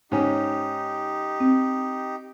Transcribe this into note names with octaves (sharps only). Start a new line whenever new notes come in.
G#2 C#4 D#4 G4
C4